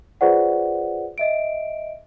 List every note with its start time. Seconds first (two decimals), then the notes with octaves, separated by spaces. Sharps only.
0.21 F4 G#4 B4 C5 D5 F#5
1.18 D#5 E5 D7